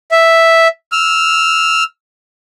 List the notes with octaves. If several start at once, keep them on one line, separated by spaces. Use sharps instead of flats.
E5
E6 F6